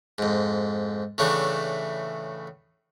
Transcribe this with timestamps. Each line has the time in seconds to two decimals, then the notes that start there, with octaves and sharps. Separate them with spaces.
0.18 F2 G#2
1.18 A2 C#3 E3 A3 D4